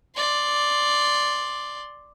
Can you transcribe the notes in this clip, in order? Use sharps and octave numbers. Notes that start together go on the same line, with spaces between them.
D5 C6